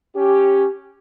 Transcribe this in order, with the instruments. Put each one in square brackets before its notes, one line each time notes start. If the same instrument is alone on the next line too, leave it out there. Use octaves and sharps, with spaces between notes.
[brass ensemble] C#4 G4